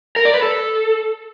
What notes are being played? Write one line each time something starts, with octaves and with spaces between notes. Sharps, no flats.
A#4
D5
B4
A4